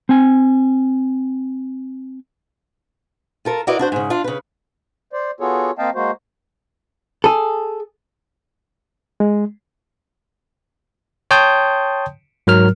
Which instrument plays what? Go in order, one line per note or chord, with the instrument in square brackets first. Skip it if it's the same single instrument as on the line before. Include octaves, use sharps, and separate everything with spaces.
[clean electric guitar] C4 G#5
[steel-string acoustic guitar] F4 A4 A#4
E4 F#4 A#4 B4 D5 D#5
D4 F#4 C5
G#2 C#3
D4 F4
C#3 B4
[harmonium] C5 D5
B3 F4 F#4 G#4 A4 C#5
A#3 C4 D#5 F5 G5 A5
G#3 A#3 F#4 C5
[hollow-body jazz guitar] G#4 A4
[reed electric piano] G#3
[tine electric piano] C#5 G5 A5 C6 D#6 G6
G#2 F#3 A#4 F6